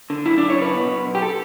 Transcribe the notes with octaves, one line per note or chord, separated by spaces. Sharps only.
D3
F#2 E4
D4
F#2
C#5
C#3 B4
B2
B1
B1
G4
A4